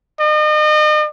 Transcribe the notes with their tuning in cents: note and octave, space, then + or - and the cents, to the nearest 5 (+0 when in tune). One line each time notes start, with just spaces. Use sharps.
D#5 -40